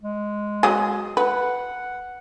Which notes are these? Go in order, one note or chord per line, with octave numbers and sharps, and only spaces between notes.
G#3
F#3 G#4
B4 F#5